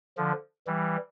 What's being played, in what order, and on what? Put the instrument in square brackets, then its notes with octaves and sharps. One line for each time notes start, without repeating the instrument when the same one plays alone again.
[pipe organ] D3 F3
E3 G3